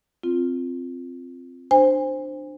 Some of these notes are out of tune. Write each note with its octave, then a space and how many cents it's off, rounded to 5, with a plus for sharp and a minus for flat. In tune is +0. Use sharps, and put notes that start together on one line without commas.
C4 +0 F4 +0
D4 +25 C5 +5 G#5 -35